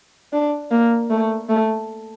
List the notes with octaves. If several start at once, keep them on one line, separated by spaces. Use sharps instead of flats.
D4
A#3
A3
A3